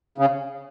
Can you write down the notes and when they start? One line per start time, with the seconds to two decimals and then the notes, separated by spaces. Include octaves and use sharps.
0.18 C#3